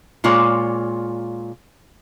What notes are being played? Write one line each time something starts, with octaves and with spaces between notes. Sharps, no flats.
A#2 G#3 F4 C#5 D5